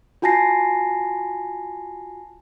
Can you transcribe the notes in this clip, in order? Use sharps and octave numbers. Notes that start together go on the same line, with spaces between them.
F4 F#4 G#5 A5 A#6 C7